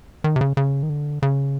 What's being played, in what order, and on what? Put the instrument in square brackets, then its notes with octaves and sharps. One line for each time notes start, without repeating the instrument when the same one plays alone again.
[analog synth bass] D#3
C3
C#3
C#3
D#3
D3
C#3